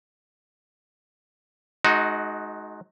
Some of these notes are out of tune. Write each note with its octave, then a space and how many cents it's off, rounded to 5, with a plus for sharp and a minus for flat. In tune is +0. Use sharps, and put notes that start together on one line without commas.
G#3 +35 D#4 +0 F#4 +0